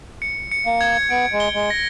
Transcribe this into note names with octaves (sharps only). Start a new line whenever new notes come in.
C#7
C#7
A#3
G#6
B3 D7
G#3
G7
G#3
A#6